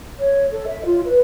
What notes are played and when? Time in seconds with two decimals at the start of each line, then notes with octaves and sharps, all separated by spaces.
0.17 C#5
0.52 A4
0.67 E5
0.85 F4
1.05 B4